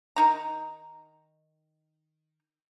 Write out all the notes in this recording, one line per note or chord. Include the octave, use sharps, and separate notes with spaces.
D#3 D#4 A#5